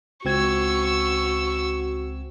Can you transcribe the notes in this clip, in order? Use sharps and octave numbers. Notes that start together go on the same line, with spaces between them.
C#2 C4 F#4 C#6 E6 G#6